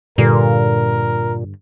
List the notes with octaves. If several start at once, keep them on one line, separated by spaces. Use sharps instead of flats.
G2 A#2 D3 A#4